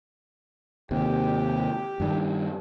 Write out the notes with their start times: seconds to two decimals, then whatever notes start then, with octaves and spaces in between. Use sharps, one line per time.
0.91 D#2 C3 G4
2.00 G2 D#3 G3